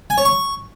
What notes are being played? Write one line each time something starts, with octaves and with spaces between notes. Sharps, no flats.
G#5
C#5
C#6